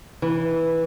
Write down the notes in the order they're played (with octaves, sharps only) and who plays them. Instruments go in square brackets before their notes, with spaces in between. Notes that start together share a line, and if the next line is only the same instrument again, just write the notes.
[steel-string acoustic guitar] E3